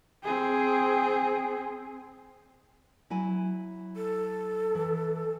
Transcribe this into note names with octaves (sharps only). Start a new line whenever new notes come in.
C4 G#4
F#3 E4 G#5
A4
E3